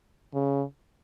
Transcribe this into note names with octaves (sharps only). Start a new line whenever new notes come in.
C#3